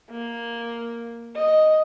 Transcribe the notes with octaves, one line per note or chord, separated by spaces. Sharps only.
A#3
D#5